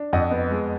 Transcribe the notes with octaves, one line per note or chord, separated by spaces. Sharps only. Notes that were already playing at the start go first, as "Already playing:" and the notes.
Already playing: D4
F2 D#5 F#5
B3
G#3